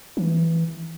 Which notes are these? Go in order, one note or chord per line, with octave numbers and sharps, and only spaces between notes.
E3